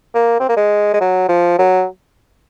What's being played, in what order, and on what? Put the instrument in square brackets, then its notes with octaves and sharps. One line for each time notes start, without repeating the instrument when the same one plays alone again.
[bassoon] A#3
C4
A#3
G#3
G#3
F#3
F3
F#3